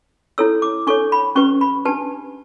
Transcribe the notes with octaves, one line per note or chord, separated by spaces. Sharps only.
E4 A4 C#5 E6
D6
D4 A4 C#5 C#6
B5
C#4 G4 B4 C#6
B5
D4 G4 B4 A5